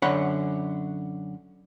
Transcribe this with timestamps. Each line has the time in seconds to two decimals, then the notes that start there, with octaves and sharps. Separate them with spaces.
0.02 F#2 D3 C#5 F#5 B5